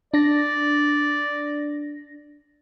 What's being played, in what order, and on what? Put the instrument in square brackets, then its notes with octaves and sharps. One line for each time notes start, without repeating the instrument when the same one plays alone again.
[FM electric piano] D4 A#6 [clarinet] D5